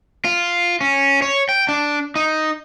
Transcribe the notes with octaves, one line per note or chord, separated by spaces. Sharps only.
F4
C#4
C#5
G5
D4
D#4